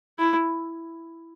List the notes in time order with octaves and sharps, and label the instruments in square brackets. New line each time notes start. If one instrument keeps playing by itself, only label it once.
[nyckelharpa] E4